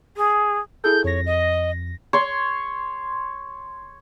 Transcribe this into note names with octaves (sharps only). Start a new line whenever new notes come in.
G#4
E4 G#4 A4 G6
F2 C#5 A#6
D#5
C#5 C6